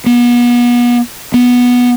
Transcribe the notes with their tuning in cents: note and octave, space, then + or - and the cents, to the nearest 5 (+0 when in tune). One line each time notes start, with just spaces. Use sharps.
B3 -35
B3 -10